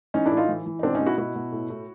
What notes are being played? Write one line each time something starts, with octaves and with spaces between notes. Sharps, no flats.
E3 C#4 D#4
D4 E4
A2
D#4 F4
E3
E3
D#4
B2 C4 D4
C#4 D#4
B2
E4 F#4
B2 E4 F#4
B2
A2
A2